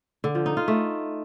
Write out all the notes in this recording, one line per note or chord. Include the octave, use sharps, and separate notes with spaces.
D3
F3
D#4
F4
A3